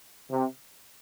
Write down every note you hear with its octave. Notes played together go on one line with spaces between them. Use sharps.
C3